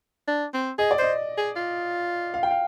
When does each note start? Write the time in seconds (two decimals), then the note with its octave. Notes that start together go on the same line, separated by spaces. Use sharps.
0.27 D4
0.53 C4
0.78 G#4 D#5
0.91 D5
0.98 C5 D#5
1.37 G#4
1.56 F4
2.34 F5
2.43 G5
2.51 F5